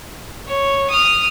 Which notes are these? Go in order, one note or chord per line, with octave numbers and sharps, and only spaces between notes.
C#5
D#6 F6